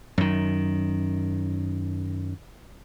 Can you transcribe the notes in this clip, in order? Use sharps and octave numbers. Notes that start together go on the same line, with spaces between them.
F#2 D#3